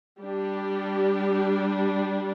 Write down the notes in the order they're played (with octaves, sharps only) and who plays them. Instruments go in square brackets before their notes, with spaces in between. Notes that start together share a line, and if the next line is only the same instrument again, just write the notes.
[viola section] G3 D4 G4